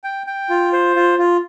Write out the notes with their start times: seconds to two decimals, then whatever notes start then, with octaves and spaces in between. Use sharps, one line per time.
0.04 G5
0.27 G5
0.50 F4
0.73 C5
0.96 F4
1.18 F4